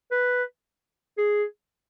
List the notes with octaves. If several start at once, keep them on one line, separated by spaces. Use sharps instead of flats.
B4
G#4